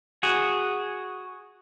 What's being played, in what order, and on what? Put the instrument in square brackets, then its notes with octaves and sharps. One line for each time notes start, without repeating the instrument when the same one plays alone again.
[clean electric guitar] F#4 G#4